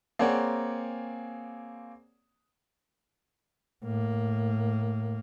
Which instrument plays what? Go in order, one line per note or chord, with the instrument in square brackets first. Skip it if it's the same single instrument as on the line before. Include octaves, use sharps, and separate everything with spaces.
[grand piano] A#3 C4 G#4 C#5 D5 F#5
[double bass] A2 A#3